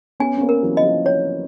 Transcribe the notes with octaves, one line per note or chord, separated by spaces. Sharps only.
B3 C#4 G#5
C#4
A#3 C4
A#4
E3 F#3
F3 D#5
E3 F#3
C#5